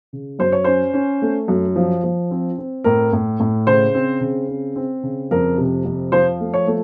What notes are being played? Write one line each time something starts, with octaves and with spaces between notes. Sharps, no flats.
C#3
F#2 C5
C#5
C#4 C5
C#4
A3
F#2
F3
F3
C4
C4
A2 A#4
A2
A2
C#3 C5
C4
C#3
C4
C4
C#3
F2 A#4
C3
F2
F3 C5
A3
C#5
A3